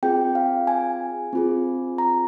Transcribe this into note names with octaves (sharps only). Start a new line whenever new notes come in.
C4 F4 G#4 G5
F5
G#5
C4 F4 G#4
A#5